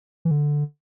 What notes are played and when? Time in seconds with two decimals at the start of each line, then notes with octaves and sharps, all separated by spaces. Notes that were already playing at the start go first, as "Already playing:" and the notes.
0.25 E3
0.31 D3